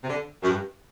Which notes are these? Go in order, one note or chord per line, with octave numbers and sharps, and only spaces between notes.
C3
D3
F#2
G2